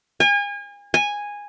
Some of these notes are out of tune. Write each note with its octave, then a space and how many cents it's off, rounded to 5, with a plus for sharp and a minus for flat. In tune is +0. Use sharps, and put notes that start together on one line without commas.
G#5 -35
G#5 -10